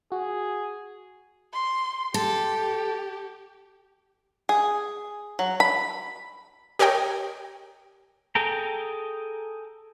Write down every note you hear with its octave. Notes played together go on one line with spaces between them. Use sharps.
F#4 G#4
C6
G4 A4
G#4
F#3
B5
G4 A#4 C#5 D#5 G5
G#4 A4 G5 A#5